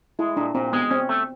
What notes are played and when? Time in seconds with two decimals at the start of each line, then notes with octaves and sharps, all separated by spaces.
0.19 G#3 E4
0.37 A#2 D4
0.55 A#2 C4
0.73 G#3 B3
0.91 C4 C#4
1.09 A3